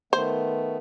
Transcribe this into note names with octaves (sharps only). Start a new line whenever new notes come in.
D#3 A3 B3 C5